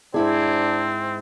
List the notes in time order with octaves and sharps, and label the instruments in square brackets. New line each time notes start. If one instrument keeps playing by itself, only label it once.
[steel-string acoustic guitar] G#2 E4 G#4 [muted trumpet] C4 [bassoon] D4